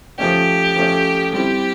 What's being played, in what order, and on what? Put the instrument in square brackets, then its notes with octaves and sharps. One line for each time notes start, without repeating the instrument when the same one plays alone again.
[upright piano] F3 A3 C#4 [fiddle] G4
[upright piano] F3 A3 C#4
[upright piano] G3 C4 E4 [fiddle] G4